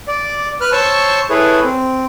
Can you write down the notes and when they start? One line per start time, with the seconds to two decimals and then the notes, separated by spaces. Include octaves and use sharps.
0.08 D5
0.61 B4 F6 F#6
0.72 C5 C#5 A5 C#6 E6
1.30 E4 G#4 A4 B4 C#5
1.64 C4